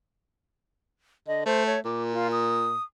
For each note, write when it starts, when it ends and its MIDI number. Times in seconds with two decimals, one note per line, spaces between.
1.27 1.43 50
1.27 1.44 75
1.46 1.77 57
1.46 1.66 72
1.66 1.80 73
1.85 2.74 46
1.85 2.03 86
2.13 2.28 65
2.32 2.83 87